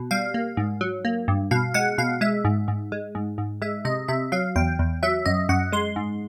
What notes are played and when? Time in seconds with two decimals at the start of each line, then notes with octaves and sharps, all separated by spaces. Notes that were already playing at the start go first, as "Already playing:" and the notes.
Already playing: B2
0.11 G3 F5
0.34 A#3
0.57 G#2
0.81 F#3
1.05 A#3
1.28 G2
1.51 B2 F5
1.74 G#3 F#5
1.98 B2 F5
2.21 G#3 E5
2.45 G#2
2.68 G#2
2.92 G#3
3.15 G#2
3.38 G#2
3.62 G#3 E5
3.85 C3 D#5
4.08 C3 E5
4.32 F#3 F5
4.56 E2 G5
4.79 E2
5.03 F#3 E5
5.26 F#2 D#5
5.49 F#2 F#5
5.72 G#3 C6
5.96 G#2